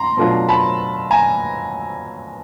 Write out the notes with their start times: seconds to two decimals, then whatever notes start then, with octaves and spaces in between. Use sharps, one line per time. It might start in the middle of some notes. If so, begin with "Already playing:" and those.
Already playing: A#5 C6
0.17 B2 F#3 A3 D4 F4
0.48 A5 B5
1.11 G#5 A#5